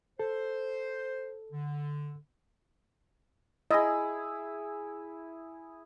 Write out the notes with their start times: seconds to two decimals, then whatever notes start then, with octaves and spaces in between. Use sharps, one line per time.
0.19 A4 C5
1.52 D3
3.71 E4 G#4 D#5